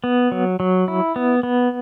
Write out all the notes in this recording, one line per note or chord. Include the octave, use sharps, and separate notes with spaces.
B3
F#3
F#3
E4
B3
B3